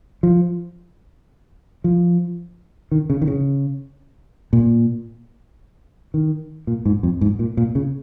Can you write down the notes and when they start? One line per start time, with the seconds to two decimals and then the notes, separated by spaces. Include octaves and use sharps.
0.23 F3
1.84 F3
2.92 D#3
3.10 C#3
3.22 D#3
3.27 C#3
4.53 A#2
6.14 D#3
6.67 A#2
6.86 G#2
7.03 F2
7.21 G#2
7.39 A#2
7.57 A#2
7.75 C#3